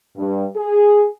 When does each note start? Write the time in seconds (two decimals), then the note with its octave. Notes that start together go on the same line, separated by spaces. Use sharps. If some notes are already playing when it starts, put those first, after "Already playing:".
0.17 G2
0.56 G#4